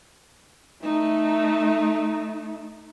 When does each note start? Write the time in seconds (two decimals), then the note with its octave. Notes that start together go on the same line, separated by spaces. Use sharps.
0.83 A3 D#4